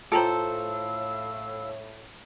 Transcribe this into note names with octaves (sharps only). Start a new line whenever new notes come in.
A2 F4 A4 C5 F5 G5 A#5 E6